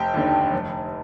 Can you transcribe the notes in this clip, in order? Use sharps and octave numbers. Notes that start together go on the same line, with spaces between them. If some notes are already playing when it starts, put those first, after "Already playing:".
Already playing: F1 G4 G5
D#2 D3
F1